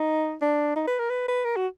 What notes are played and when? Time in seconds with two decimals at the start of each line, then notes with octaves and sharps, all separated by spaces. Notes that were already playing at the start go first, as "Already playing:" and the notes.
Already playing: D#4
0.42 D4
0.76 D#4
0.88 B4
0.99 A#4
1.10 B4
1.28 B4
1.45 A#4
1.57 F#4